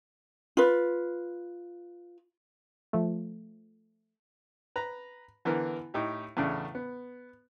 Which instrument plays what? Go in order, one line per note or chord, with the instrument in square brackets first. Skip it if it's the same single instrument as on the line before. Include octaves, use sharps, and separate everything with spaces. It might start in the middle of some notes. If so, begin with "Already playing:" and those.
[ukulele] F4 B4
[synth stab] F3 A3
[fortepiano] B4 A#5
D3 E3 B3 A#4
A2 D#4 G4
E2 A2 C#3 A3 D4
B3